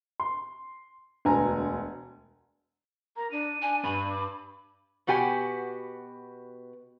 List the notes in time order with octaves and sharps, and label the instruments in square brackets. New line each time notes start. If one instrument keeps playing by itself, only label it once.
[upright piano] C6
E1 D2 B4 G#5 A#5
[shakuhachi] A#4 [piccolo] A#5
[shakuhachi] D4 [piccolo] D#7
[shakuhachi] D4 [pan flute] G#5
[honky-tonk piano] G2 [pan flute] B5
[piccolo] D6
[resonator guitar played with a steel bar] B2 B3 F#4 G4 G#5